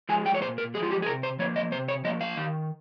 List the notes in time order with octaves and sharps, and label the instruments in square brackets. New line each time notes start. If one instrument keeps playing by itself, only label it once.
[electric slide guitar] F3 G#3 G#5
G5
C#5
A#2 C5
A#4
F3 G#3 G#4
F4
G4
G#4
C3 A#4
C5
F3 A#3 C#5
D#5
C3 C5
C#5
F3 A#3 D#5
F5
D#3